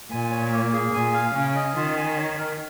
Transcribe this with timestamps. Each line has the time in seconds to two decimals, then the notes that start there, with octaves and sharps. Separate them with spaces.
0.11 A#2 G#5
0.31 C#5
0.52 A#3
0.73 G#4
0.93 A#2 G#5
1.14 F5
1.34 C#3 C#4
1.56 D#5
1.76 D#3 F4
1.97 G#5
2.17 C#5
2.38 A#4